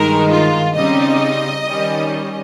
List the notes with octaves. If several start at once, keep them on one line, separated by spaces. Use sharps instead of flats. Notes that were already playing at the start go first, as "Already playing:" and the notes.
Already playing: G2 D#3 G#3 D#4 A#4
F4
C#3 G3 C4 D#4 D#5
D#3 G3 C#4